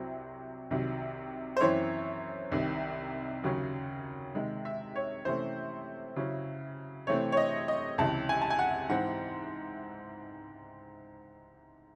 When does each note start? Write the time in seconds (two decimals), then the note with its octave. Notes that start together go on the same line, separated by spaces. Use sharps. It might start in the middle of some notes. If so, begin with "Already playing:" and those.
Already playing: C2 C3 F#3 C4 E4
0.71 C2 C3 D#3 F#3
1.57 C5
1.61 F#2 E3 C4 E4 C#5
2.52 C2 C3 D#3
3.44 D#2 C#3 F#3 C#4
4.35 C3 D#3 G#3
4.65 E5
4.96 C#5
5.25 C3 E3 A3 C#4 C5
6.16 C#3 F#3 C#4 E4
7.07 C3 E3 A3 C4 C#5
7.32 C#5
7.37 D#5
7.68 D#5
7.98 C#2 C3 E3 A5
8.29 G#5
8.42 A5
8.50 G#5
8.59 F#5
8.89 G#2 E3 C4 F#5